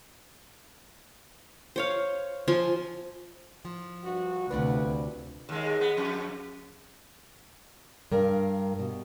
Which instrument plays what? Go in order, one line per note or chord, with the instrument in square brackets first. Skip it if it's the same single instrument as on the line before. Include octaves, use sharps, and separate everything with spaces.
[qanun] C5 C#5 F5
F3 F4 G#5 C6
[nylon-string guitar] F3
[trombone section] G2 F#4
[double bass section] D2 C3 [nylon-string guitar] D4 F4 F#4 [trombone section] B4
[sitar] D#2 G#3
B3
F2
[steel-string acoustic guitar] G2 A#4 F5
B2